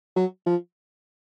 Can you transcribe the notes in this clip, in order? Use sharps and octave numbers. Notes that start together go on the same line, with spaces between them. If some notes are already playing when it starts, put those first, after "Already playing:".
F#3
F3